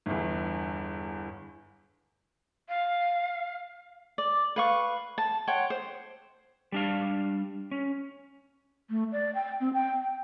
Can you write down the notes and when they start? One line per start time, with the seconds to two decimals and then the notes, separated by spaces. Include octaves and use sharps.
0.06 G1 E2
2.69 F5
4.18 D5
4.56 B4 F5 C#6
5.18 A5
5.47 C#5 F#5 G5 C6
5.70 C5
6.72 G3 D4 F5
7.71 C#4
8.90 A3
9.12 D5
9.35 G5
9.61 C4
9.74 G5
10.00 G5